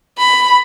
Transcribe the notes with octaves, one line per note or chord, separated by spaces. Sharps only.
B5